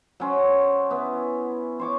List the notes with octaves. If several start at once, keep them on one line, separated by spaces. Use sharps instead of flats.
F#3 C#4 C5
B3 E4
C5 C#5 D6